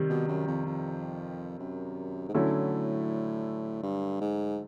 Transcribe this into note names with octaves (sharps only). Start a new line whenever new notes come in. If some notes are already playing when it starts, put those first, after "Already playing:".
Already playing: C3 D#3 G3
B2
F#2
F2
F2
F#2
G#2
A2 D3 F#3 A3 C#4 E4
G2
G#2